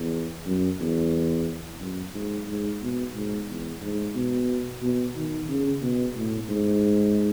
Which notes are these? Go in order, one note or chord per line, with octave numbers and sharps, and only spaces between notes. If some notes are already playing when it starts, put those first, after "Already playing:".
Already playing: E2
F#2
E2
F#2
G#2
G#2
B2
G#2
E2
G#2
B2
B2
D#3
C#3
B2
A2
G#2